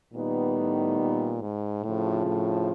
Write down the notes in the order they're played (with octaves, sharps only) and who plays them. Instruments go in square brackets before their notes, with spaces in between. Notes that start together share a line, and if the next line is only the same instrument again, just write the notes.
[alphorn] A#2 [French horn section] D#3 G3 B3 D#4
[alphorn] A2
A#2
G#2
[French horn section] D2 C#3 F3 [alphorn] A2
[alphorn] A2